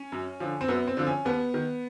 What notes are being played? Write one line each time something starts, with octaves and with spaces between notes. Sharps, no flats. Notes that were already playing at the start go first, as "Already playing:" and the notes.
Already playing: C#4
F#2
D3 F3
C4
F#2 B3
C4
D3 F3
C#4
D#2 B3
D#3